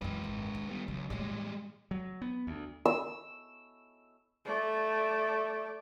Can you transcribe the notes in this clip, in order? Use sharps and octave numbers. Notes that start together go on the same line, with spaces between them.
F#2 E3 G#3 B4
G#1
D#3
G3 B3
C#2 F#3
A2 E3 G3 G#3
F#3
B3
D2
E6
A3 D5